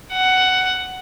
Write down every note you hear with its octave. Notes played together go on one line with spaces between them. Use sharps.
F#5